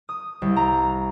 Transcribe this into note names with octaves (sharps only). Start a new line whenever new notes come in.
D#6
C2
A#5